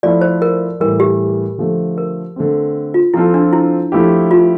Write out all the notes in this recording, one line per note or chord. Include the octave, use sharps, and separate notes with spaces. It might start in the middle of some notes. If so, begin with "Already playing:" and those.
F3 A3 E4 A4 D5
C5
A#4
A2 E3 G3 A#4
G4
D3 F3 A3
A#4
D3 A3 C4
F4
F3 C4 E4 F4 A4
D4
E4
F3 A3 E4 G4
F4